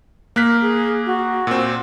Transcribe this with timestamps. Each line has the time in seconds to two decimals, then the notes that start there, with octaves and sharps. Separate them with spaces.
0.36 A#3 A#4 F#6 B6
0.61 G#4
1.06 F#4
1.47 A#2 C4